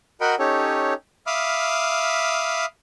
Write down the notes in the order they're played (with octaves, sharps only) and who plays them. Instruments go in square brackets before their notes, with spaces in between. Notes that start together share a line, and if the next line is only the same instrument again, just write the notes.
[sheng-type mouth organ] F#4 A#4 D#5 F#5 G5 B5
C#4 D#4 G4 A4 C#5
E5 F5 B5 D6 D#6 F6